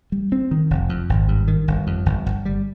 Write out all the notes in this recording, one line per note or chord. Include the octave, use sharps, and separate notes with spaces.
G3
C4
D#3
F1
F2
G#1
G2
D#3
G1
F2
G1
G1
G3